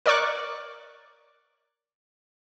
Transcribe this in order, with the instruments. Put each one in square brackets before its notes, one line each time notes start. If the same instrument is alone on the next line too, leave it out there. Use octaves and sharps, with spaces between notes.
[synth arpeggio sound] A#4 C#5 D5 C#6 D6 F#6